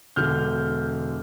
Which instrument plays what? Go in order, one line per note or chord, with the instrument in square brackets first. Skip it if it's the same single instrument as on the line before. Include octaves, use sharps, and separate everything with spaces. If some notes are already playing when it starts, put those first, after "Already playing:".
[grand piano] E1 D3 F6 G6